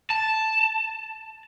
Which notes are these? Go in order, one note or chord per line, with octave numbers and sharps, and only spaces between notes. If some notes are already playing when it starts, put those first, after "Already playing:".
A5